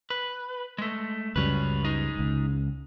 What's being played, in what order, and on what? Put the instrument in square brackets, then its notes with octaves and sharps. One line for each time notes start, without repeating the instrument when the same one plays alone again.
[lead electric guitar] B4
G#3 A3
[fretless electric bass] C#2 F#2 G3 [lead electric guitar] C#4 B4
[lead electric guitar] G#3 D#4
[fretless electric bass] C#2